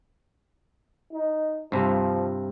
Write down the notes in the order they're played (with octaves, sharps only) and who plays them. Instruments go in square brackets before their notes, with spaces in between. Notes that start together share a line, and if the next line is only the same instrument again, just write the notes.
[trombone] D#4
[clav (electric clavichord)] G2 C3 [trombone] F3